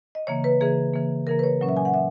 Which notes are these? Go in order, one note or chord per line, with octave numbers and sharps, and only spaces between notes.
D#5
C#3 E3 A#3 C#5
B4
C#3 E3 A#3 G#4
C#3 E3 A#3
C#3 E3 A#3 A#4
B4
C#5
A#2 F#3 C#4
E5
G#5
F#5
A#2 E5